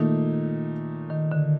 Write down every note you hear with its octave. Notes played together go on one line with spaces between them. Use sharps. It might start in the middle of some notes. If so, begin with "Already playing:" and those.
Already playing: A#2 D#3 A3 D#4
D#3
D3